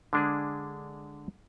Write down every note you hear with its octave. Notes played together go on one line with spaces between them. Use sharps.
D3 G#3 D4 G#4